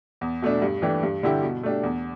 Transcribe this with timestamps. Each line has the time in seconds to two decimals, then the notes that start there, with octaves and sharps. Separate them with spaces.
0.21 E2
0.42 B2 A3 D4
0.62 G2
0.82 E3 A3 D4 G4
1.03 G2
1.23 D3 G3 E4 G4
1.43 B2
1.63 A3 D4 G4
1.83 E2